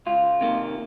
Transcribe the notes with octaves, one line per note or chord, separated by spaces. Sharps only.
C#2 F4
C3 D#3 A#3